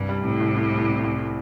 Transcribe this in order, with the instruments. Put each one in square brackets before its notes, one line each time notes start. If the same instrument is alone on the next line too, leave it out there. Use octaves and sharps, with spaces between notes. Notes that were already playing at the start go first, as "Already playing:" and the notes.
Already playing: [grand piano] C2 [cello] G2
[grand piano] G3
[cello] A2 [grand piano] C3
[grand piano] C2
C2
G3
C3
C2